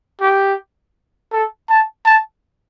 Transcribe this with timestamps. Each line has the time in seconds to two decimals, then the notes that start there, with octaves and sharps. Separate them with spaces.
0.20 G4
1.32 A4
1.69 A5
2.05 A5